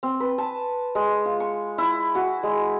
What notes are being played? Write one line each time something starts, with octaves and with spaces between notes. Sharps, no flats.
C4
B4
A5
G#3
F4
C#6
E4
F#4
G#3